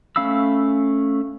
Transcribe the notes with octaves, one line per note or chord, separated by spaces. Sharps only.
A3 C#4 F5 B5 E6